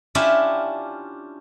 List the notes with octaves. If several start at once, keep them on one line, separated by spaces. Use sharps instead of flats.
C#4 D4 E4 F4 G4 E5